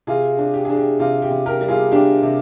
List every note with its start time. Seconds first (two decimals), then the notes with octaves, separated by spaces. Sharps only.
0.07 C3 F4 G#4
0.38 D4
0.54 G4
0.65 D4 G#4
0.77 G4
0.99 C3 F4
1.22 G4
1.30 C3
1.46 G4 A#4
1.61 G3
1.68 F4 G#4
1.92 D4 G4
2.22 C3